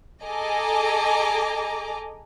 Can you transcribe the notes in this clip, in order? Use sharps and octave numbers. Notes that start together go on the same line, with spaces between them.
G#4 A4 D#5 G#5 A#5 D6